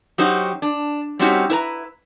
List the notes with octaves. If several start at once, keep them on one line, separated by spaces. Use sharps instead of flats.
F#3 C#4 D#4 F#4 G4 C5
D4
G3 C4 C#4 D#4 F#4 G4
E4 B4 A#5